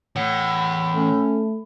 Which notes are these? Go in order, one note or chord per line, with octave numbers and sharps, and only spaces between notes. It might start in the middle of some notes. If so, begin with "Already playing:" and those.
A2 E3 F#5
A3 C#4